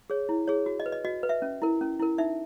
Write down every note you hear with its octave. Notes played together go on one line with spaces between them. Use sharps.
G#4 C#5
E4
G#4 C#5
F#4
D#5
B4
D#5
F#4 D#5
B4
E5
C#4
E4 A#4
C#4
E4 A#4
D#4 E5